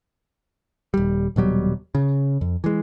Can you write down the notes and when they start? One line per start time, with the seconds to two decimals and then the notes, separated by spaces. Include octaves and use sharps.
0.94 D#1 G3
1.36 D#1 B2 F#3 G3
1.95 C#3
2.41 F2
2.64 E3 G#3